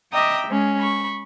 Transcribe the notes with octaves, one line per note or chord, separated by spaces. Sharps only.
D#5 E5 G5 A#5 D6 D#6
G#3 C#4
B5 C#6